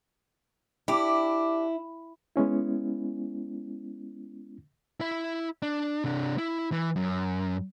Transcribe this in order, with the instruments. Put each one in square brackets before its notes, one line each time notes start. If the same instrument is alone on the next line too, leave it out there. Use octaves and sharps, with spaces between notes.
[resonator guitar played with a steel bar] D4 G4 [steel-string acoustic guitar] E4
[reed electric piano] G#3 B3 C#4 E4
[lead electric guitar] E4 E5
D4
C3 D4
E4
E3
F#2